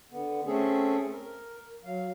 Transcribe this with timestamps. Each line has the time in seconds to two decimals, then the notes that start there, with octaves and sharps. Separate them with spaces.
0.11 D3 B3
0.47 A3 C4 C#4 G#4 A4
1.12 A#4
1.84 F#3 F5